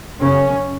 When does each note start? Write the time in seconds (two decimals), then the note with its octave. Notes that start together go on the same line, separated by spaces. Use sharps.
0.19 F#2 C#3 C#4